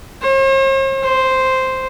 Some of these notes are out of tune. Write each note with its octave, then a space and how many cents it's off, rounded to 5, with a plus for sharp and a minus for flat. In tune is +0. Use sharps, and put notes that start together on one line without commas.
C5 +45
C5 -5